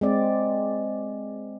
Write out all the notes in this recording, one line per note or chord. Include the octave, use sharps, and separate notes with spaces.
G#3 C4 D5